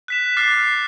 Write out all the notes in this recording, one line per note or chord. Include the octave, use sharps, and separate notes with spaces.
F#6 B6 E7
D6 F6 A6 C7